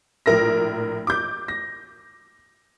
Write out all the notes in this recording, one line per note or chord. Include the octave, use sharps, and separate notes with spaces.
A#1 A2 A#4 E5 A#6
D6 G6
A#6